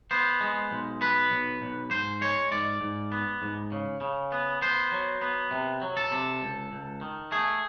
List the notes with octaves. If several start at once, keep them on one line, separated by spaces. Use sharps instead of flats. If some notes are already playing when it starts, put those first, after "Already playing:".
B3 C5
G#3
B1
B3 B4
B1
B1
G#2 C5
G#3 C#5
G#2 D5
G#2
B3
G#2
C#3
C#3
B3
B3 C5
F#3
B3
C3
F#3
A4
C3
C#2
C#2
D#3
A3 G#4